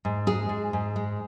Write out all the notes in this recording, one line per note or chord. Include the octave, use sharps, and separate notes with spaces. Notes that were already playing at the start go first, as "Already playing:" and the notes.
G#2
G#3 G#4
G#2
G#2
G#3